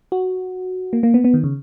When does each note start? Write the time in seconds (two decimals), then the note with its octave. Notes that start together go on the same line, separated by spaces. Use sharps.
0.12 F#4
0.93 A#3
1.03 A#3
1.14 B3
1.24 B3
1.34 D#3
1.44 C#3